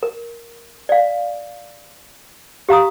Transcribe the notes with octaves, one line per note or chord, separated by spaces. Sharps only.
A#4
D5 F5
G4 F5 A#5 D#6